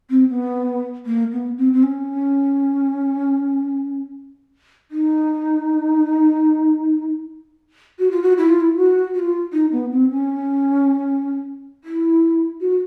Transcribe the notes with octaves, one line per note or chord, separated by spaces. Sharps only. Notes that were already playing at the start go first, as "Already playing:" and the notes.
C4
B3
A#3
B3
C4
C4
C#4
D#4
F#4
F4
F#4
E4
F4
E4
F#4
F#4
F4
D#4
B3
C4
C#4
E4
F#4